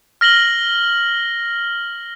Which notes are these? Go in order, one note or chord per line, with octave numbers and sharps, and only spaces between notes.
F6 A#6 F#7 G7